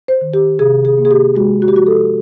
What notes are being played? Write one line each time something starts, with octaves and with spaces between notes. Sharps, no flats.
C5
D#3
G4
C3 G#4
G#4
A#3
G#4
G4
G#3 F#4
F#4
G4
F3 F#4
A4